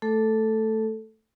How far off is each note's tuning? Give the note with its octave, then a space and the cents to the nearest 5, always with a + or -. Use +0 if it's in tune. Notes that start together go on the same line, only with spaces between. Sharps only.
A3 +0 A4 +0